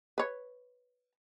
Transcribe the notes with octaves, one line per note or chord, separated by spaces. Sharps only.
B4 C#5